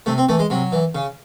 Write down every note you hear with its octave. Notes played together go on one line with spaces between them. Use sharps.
C3 A3
C4
E3 A3
G#3
C3 F#3
E3
C#3